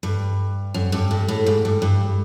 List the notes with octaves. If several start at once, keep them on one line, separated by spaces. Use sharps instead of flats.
G2
F#2
G2
A2
A2
G#2
G2
G2